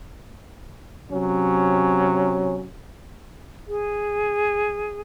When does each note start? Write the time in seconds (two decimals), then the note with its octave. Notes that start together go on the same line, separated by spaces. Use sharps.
1.10 C3 F#3 C#4
3.68 G#4